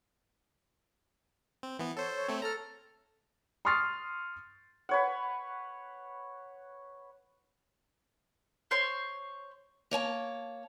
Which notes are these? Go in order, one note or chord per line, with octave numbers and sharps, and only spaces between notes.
C4
E3 B3
A4 C5 C#5
C#5
A3 C4
A4 A#5 F6
C6 C#6 D#6 F6 A6 C7
B4 C#5 F#5
C5 C#5 C6
A#3 C#5 G#5 A5